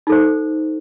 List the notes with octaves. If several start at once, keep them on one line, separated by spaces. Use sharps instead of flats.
D#4 A4 C5